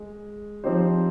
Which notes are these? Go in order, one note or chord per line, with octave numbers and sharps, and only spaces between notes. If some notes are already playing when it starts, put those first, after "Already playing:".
Already playing: G#3
F3 C4 D#4 G4 C5